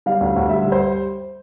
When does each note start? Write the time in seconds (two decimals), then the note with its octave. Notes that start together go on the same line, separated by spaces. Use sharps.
0.06 G3 F5
0.21 D2
0.36 D2
0.49 G3 E5
0.65 G3
0.72 C5